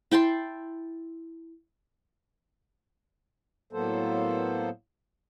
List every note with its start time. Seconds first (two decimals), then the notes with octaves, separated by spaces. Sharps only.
0.11 E4 G5 A5 C6
3.73 A2 F#3 A#3 B3 A4 C5